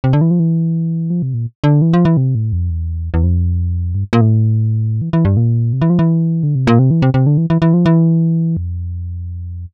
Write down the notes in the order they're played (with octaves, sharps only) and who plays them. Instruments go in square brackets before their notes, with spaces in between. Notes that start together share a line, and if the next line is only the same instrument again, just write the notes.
[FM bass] C3
D3
E3
F3
E3
F3
C3
A#2
D3
E3
F3
E3
C3
A2
F2
E2
E2
F2
G2
A#2
A2
E3
E3
G2
A#2
C3
E3
F3
E3
D3
C3
A#2
C3
E3
C3
C3
D3
E3
E3
E3
F3
E3
F2